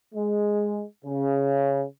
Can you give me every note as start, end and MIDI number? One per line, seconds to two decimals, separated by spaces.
0.14 0.83 56
1.05 1.84 49